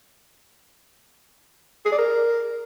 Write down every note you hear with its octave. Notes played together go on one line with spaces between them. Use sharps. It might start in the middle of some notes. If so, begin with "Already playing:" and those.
G#4
D5
A#4